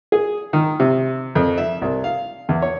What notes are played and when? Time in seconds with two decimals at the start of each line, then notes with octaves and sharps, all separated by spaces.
0.12 G#4
0.53 D#3
0.80 C3
1.35 F2
1.58 E5
1.82 C2
2.04 F5
2.49 E2
2.62 C#5